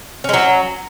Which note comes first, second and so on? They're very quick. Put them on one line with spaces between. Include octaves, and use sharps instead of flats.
C#4 G#3 F#3